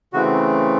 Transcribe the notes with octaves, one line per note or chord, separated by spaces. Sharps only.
C#3 E3 A3 C4 F#4